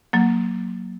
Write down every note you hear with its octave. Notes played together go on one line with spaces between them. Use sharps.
F#3 A#3